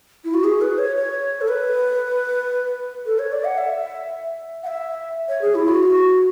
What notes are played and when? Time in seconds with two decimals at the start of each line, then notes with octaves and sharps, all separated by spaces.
0.25 E4
0.34 F#4
0.44 G#4
0.61 B4
0.78 C#5
0.96 C#5
1.41 A4
1.48 B4
3.06 A4
3.19 C#5
3.32 D5
3.45 F#5
3.58 E5
4.63 F#5
4.67 E5
5.28 C#5
5.42 G#4
5.55 E4
5.68 F#4